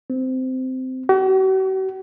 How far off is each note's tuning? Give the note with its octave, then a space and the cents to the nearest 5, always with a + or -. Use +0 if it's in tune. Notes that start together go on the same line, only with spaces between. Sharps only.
C4 -15
F#4 +45